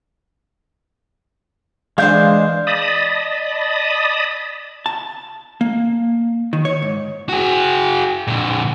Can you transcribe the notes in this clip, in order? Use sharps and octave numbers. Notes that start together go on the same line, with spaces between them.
E3 G#3 D4 C5 F5 G6
D5 D#5 A5 B5 D#6
A5
A#3
D#3
C#5
G#2
F#4 G#4
A#2 D3